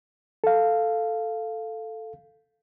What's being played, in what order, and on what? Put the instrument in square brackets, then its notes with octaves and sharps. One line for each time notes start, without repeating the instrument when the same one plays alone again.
[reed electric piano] A4 F5